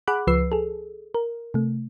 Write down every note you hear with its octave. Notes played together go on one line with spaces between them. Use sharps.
G#4 F#5 B5 D6 F#6
C#2 F3 B4 E6 C7
G#4 A4
A#4
C3 A3